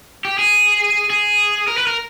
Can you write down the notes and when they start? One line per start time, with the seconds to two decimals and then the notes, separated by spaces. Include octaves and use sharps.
0.25 G4
0.39 G#4
1.10 G#4
1.68 A#4
1.78 B4
1.87 A#4